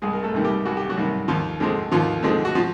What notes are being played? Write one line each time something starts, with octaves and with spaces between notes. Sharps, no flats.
C2 G#3 G#4
A#4
A3 A4
C3 D#3 G3
G3 G4
C2 F#4
G4
F#3 F#4
C3 D#3 G3
D#2 F3 F4
D3 F3 G#3 C4
D#2 F3 F4
D3 F3 G#3 C4
F#4
F3 F4